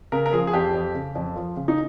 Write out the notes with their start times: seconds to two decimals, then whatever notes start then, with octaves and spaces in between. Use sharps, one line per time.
0.12 C#3 A#4
0.26 A#4
0.32 F3 G#4
0.47 G#4
0.53 F2 G4
0.74 F2
0.95 C#3
1.15 F2
1.36 F3
1.57 C#3
1.68 D#4